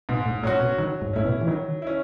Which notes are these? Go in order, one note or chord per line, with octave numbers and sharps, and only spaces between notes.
G#2 B2
A2
A2 F#3 C#4 F#4
B2
D#3 F#3
G#2
A2 C#4 E4
B2
E3
D#3 F#3
C#4 E4